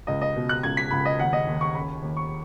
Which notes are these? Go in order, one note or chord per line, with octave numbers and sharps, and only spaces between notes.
C#2 D#5
D#5
B2
F#6
C#2 G#6
B6
C#2 B5
D#5
D#2 F#5
D#5
D#2
C#6
C#3 B5
D#2
C#6